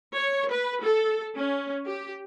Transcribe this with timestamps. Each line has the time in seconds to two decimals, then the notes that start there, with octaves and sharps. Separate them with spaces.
0.14 C#5
0.48 B4
0.81 A4
1.37 C#4
1.86 G4